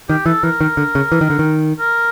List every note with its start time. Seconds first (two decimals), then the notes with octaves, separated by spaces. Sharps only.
0.09 D#3 G4
0.26 E3 A4
0.43 E3 A#4
0.61 D#3
0.77 D3
0.95 C#3
1.12 E3
1.21 D#3
1.30 D3
1.39 D#3
1.80 A#4